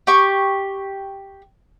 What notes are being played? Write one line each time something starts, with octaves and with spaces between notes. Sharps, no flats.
G4 C#6